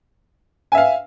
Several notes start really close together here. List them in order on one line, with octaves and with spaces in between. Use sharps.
G#5 E5 F5